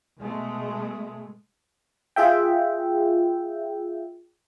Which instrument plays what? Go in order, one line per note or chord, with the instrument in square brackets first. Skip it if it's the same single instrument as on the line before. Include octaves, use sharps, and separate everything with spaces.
[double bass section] B2 G#3 A3
[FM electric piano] F4 G#4 E5 G5